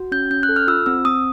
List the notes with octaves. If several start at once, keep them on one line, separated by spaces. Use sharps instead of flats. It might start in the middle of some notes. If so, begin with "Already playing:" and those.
Already playing: F#4
C#4 G6
C#4 G6
F#6
A4
F6
F4 E6
C4 E6
C4 D#6